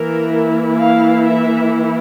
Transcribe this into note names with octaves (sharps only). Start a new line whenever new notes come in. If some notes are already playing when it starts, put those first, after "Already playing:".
Already playing: E3 A#3 E4 A#4
F5
E5